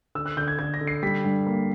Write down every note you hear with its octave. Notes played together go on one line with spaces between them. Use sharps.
D3 E6
F#6
D3 G6
G#6
D3 G#6
A#6
D3
C7
G3 B6
G2
A#3